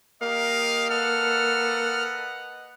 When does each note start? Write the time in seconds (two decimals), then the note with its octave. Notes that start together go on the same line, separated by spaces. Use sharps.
0.22 A#3 G4 A#4 D#5 F5
0.90 A4 B4 D#5 F#5 F6